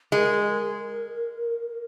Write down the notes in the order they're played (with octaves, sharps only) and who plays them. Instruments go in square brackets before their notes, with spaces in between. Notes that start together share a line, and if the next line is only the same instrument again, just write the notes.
[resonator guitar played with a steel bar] G#3 [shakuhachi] A#4